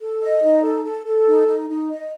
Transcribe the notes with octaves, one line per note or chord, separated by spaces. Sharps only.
A4
D#5
D#4
A4
A4
A4
D#4
D#4
D#4
D#5